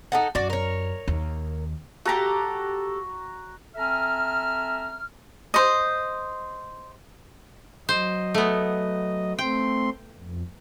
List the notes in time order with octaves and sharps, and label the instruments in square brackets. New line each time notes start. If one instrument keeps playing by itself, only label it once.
[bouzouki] D#4 A4 F#5
[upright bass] F#2 [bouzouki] F#4 D5
[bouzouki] A#4 C#5
[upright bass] D#2
[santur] F#4 A#5 [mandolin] G4 A4
[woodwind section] C4 A4 E5 G#5 A#5 F6
[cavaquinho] C5 D#5
[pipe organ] F#3 D#5 [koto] C5
[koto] A3 B3
[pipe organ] A3 C4 C6 [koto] G5
[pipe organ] F2